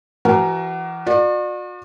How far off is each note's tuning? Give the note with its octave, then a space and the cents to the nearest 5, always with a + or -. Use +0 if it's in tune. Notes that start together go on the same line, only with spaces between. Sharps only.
E3 +30 F#4 +30 A#4 +0
F#4 -45 A#4 +0 D5 +35